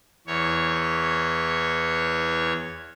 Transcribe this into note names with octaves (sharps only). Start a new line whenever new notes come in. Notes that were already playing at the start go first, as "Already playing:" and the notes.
E2 C#5